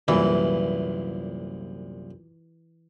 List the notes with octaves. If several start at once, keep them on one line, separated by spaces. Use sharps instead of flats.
C2 F#2 A#2 E3